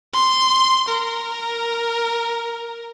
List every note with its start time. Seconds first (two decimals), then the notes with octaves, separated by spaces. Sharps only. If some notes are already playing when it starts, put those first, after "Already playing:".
0.13 C6
0.89 A#4